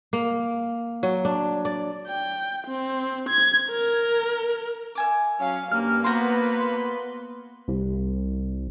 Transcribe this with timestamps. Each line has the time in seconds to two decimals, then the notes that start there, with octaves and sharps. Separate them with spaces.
0.13 A#3
1.03 F#3
1.25 D4
1.65 D5
2.08 G5
2.67 C4
3.29 G#6
3.69 A#4
4.95 E5 G#5 D6
5.40 F#3 C#4 F5
5.72 G2 A#3 C#4 F6
6.04 B3 F#4 B4 C5 A#5 C6
7.68 C2